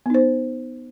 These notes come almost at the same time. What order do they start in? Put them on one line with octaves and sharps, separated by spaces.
B3 D#4 C5